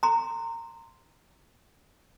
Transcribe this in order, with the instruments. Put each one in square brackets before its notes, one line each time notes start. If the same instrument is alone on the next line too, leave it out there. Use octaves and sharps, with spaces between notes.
[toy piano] A#5 C6